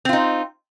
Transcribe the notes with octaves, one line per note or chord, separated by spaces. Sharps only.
C4 D#4 F4